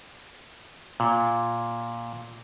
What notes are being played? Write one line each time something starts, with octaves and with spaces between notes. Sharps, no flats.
A#2